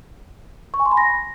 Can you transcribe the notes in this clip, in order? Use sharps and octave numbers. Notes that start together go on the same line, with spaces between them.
C#6
G#5
C6
B5
A#6